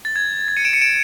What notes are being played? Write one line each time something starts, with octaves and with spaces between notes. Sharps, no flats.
A6
G#6
A6
C#7 D#7
D7 E7
C#7 D#7
D7 E7